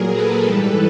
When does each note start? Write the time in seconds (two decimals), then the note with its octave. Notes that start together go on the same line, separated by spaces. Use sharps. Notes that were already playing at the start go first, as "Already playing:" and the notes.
Already playing: A#2 F#3 G#4 A#4
0.13 A4 B4
0.45 G#2 E3 G3